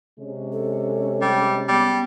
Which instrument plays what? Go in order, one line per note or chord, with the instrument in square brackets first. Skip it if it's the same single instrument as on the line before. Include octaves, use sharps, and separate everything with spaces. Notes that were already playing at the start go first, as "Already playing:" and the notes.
[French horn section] C3 G#3 C#4
[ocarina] A4
[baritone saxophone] G3
[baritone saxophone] G3 [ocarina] B3